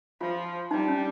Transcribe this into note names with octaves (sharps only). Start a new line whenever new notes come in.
F3 F4
G3 D#4
C#4